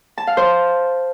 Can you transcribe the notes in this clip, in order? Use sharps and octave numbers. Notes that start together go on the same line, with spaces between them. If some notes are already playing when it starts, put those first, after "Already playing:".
A5
F5
C5